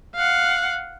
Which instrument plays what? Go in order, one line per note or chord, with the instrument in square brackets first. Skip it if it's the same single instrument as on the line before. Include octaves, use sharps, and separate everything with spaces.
[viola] F5 F#5